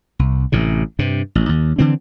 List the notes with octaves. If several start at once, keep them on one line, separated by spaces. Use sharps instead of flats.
C2
A1 A2 C3
G2 C3
A1
D#2
D3 E3 C4